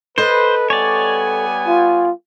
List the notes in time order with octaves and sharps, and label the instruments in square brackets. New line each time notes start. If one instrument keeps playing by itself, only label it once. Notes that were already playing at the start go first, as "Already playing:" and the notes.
[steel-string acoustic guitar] A4 D#5 [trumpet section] B4 [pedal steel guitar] C5
[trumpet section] G3 B3 G#5 [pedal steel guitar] C#5 D5
[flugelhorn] F4